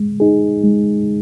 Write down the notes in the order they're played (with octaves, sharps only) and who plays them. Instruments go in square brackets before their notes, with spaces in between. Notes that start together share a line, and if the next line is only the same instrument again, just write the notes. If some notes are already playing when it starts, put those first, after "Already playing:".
Already playing: [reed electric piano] G#3
D#4 G#4
G#3